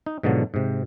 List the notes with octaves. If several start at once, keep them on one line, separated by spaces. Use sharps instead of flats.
D#4
G#2 B2 D3 F3 F#3
G#2 C3